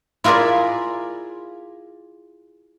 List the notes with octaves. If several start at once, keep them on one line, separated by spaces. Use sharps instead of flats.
E4 F4 G#4 A#4 D5 E5